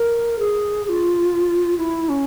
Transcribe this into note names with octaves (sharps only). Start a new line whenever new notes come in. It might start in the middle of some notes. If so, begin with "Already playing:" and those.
Already playing: A#4
G#4
G#4
F4
E4
C#4